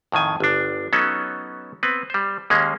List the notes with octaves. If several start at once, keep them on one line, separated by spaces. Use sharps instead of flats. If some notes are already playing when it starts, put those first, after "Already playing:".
F2 A2 D#3 G#5
G1 D4
F#3 B3 C#4 D#4 A4
B3 C4 B4
G3 C5
D#2 G#3 A#3 C#4